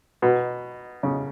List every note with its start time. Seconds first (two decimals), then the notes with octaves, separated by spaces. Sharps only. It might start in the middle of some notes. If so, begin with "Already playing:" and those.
0.22 B2
1.03 C#3